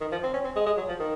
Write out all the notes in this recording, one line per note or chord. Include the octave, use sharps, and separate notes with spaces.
D#3
F3
C4
C#4
C4
G#3
G#3
F#3
F3
D#3